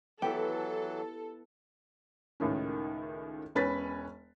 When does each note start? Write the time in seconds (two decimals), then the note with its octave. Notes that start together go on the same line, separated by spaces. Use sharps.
0.22 E3 F#3 B3 E4 G4 A4
2.40 C#2 A2 D#3 C#4
3.55 E1 C#4 B4 B5 A6 B6